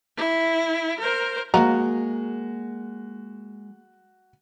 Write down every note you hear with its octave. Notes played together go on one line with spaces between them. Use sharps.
E4
A#4 C5
F3 G#3 A#3 F#4 D#5 A#5